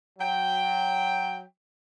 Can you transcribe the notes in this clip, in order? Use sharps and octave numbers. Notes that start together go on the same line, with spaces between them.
F#3 G5